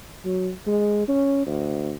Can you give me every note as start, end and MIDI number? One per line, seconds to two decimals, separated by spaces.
0.25 0.50 54
0.67 1.06 56
1.08 1.45 61
1.46 1.93 38